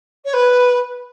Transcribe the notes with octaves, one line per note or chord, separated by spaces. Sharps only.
C#5
B4